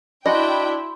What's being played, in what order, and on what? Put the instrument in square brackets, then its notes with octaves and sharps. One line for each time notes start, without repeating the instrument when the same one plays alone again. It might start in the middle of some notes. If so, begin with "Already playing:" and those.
[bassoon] D4 [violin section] E4 G5 [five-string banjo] F#4 D#5 [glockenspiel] B5 C6